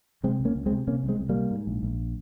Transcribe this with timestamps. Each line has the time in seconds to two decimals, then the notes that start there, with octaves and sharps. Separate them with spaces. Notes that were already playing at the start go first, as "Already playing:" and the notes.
0.23 C3 G#3 C4
0.40 C#2
0.45 A#3 C#4
0.56 C#2
0.66 G#3 C4
0.72 C3
0.87 C3 A#3 C#4
1.03 C2
1.08 G#3 C4
1.19 C2
1.29 G3 A#3
1.35 C3
1.51 G#2
1.67 A#1
1.83 A#1